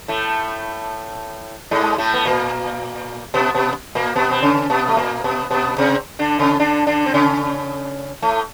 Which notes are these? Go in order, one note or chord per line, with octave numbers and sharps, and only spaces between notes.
A2 A3
G#2 G#3
A2 A3
B3
A#2 A#3
B2 B3
B2 B3
A#2 A#3
B2 B3
C4
C#3 C#4
B2 B3
A3
A#2 A#3
B2 B3
B2 B3
C3 C4
D3 D4
C#3 C#4
D3 D4
D3 D4
C4
C#3 C#4
A2 A3